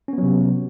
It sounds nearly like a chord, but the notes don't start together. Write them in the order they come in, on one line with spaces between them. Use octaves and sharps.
C#4 B3 F#3 C3